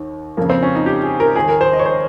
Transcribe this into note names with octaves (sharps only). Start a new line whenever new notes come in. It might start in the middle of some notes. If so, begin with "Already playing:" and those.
Already playing: D#2 D#3
F2 C#3 A#3
C4
C#4
D#4
G4
G#4
A#4
D#2 D#3 G#4
A#4
C5
D#5
C#5
C5